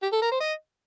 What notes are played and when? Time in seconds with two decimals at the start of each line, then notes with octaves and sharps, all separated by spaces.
0.03 G4
0.12 A4
0.22 A#4
0.32 C5
0.41 D#5